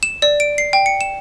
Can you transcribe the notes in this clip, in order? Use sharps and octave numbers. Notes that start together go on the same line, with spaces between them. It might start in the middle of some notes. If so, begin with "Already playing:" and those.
E7
D5
D7
C7
G5
C#7
E7